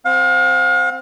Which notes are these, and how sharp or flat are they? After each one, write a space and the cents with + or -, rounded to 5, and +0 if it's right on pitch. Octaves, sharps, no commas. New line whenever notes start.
C4 +0 F5 +40